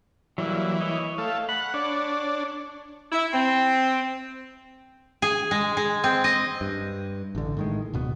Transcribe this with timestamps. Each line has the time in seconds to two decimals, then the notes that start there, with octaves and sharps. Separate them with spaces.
0.38 E3 F#3 G3 A#3
0.81 C#5 D#5
1.18 A3 F5
1.49 F#5 B5
1.74 D4 C#5
3.12 E4
3.33 C4
5.22 G#4
5.51 G#3
5.77 G#3
6.04 C4
6.24 D#5
6.61 G2
7.35 A1 D3
7.57 A2 D#3 G#3
7.93 D1 B2 B3